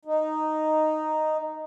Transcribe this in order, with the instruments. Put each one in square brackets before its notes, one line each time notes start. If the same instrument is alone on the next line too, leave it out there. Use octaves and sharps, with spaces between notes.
[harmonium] D#4